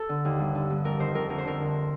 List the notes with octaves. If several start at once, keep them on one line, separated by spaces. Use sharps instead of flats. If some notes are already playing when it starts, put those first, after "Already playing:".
Already playing: A4
D3
D#2
G2
D3
G2
F2 A#4
D#3 C5
F2 A#4
D2 A#4
C5
D3 A#4
D2